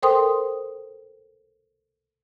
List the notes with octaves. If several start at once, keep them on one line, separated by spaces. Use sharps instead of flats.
A4 A#4 C5 G5 C6 D#6